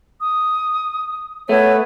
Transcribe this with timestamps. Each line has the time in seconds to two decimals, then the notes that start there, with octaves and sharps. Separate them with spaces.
0.21 D#6
1.49 A3 B3 C#5 D#7